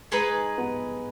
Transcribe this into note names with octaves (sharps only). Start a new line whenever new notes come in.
G#3 D#4 G#4 B4
B3